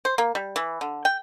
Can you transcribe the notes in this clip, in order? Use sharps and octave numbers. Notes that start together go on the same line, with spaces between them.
C5
A#3
G3
E3
D3
G5